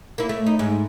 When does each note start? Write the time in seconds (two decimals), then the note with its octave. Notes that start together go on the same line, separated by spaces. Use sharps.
0.18 A#3 E4
0.29 A3
0.46 D#4
0.59 G#2